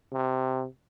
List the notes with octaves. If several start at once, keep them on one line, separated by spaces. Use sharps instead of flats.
C3